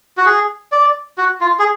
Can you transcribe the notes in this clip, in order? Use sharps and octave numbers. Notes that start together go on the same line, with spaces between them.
F#4
G#4
D5
F#4
F4
G#4